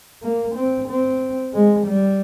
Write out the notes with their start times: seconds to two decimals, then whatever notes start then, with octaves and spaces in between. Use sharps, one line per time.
0.22 A#3
0.55 C4
0.88 C4
1.53 G#3
1.87 G3